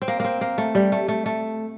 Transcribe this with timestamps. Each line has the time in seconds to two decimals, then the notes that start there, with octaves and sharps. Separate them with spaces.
0.02 C4
0.08 A#3
0.20 A#3 C4
0.41 A#3
0.58 A3
0.75 G3
0.92 A3
1.08 A3
1.26 A3